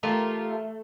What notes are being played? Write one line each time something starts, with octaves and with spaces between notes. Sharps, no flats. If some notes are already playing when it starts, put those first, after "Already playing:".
A3 F4 G4 A#4